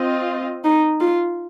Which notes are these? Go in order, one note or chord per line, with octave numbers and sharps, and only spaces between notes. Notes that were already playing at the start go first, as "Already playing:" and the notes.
Already playing: C4 F4 D#5
D#4
F4